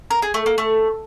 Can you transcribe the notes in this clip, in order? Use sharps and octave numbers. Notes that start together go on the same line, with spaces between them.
A#4
G#4
A3
A#3
A3